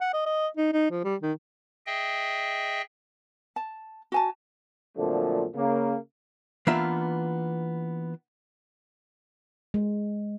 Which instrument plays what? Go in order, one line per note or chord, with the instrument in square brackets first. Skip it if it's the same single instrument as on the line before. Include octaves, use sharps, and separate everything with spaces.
[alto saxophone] F#5
D#5
D#5
D#4
D#4
F3
G3
D#3
[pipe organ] G#4 D#5 E5 G5
[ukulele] A5
F#4 G#5 A5
[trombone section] F2 A#2 D3 F3 F#3 A3
C#3 A#3
[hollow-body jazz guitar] E3 A#3 B3 D4 F4 E5
[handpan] G#3